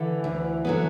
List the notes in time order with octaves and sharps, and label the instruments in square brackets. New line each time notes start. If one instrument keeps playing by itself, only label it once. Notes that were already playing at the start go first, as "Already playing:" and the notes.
Already playing: [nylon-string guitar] D3 [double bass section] E3
[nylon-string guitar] D2
D3 F#3 B3